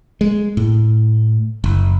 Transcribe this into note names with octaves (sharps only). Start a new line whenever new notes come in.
G#3
A2
F#1